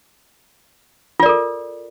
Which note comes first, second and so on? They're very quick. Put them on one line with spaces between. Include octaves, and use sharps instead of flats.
F4 D5 A#4 A4